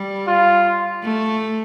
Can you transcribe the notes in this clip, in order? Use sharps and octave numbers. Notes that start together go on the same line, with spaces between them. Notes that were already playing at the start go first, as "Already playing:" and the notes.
Already playing: G3
F4
A3